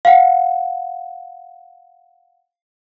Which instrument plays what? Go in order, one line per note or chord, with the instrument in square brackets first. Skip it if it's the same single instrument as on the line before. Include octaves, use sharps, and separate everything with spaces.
[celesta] F5 F#5